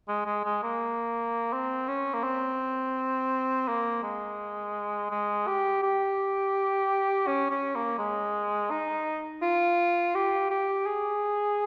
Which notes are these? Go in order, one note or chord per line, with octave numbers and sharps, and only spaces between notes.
G#3
G#3
G#3
A#3
C4
C#4
A#3
C4
A#3
G#3
G#3
G4
G4
C#4
C#4
A#3
G#3
D#4
F4
G4
G4
G#4